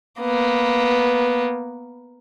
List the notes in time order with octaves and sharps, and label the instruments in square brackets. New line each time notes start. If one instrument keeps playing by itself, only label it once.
[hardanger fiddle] A#3 B3